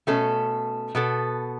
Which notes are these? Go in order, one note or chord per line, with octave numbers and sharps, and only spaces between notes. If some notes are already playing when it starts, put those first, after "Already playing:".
B2 A3 C#4 A4
B2 B3 A4